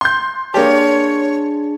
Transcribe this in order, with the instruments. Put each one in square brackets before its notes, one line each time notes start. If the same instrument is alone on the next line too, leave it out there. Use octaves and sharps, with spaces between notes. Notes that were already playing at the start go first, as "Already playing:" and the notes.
[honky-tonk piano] C6 G6
[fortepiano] A#3 G4 [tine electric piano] D4 G#4 A5 [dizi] C#5